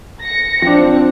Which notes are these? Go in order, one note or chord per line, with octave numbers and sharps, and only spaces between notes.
A#6 C#7
F3 C4 D4